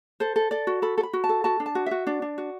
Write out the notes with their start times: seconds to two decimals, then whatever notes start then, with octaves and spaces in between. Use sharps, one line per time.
0.20 A4 C5
0.36 A4
0.51 A4 D5
0.67 F#4
0.82 A4 B5
0.98 A4
1.03 B5
1.13 F#4
1.24 A5
1.29 A4
1.44 F#4 A5
1.60 D4
1.66 A5
1.75 F#4
1.86 F#4 E5
2.07 D4 D5
2.22 D4
2.38 F#4